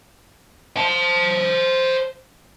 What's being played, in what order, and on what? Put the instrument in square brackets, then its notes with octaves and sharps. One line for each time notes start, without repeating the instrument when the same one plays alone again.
[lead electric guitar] C5 A5